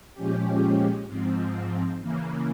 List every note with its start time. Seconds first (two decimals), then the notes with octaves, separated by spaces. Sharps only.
0.13 A#2 F3 G#3 C#4 G4
1.06 G#2 F3 C4
1.99 C#3 E3 A#3